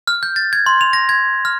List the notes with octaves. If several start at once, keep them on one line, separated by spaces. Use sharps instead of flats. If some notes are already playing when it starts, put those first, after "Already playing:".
F6
G6
A6
G#6
C6
F7
A#6
G#6
F6